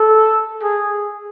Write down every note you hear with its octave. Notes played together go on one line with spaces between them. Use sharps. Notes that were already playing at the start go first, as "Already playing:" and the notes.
Already playing: A4
G#4